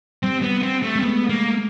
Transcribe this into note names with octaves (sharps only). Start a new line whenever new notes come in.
G3 C4
B3
C4
A3
G#3
C4
A3 B3
A#3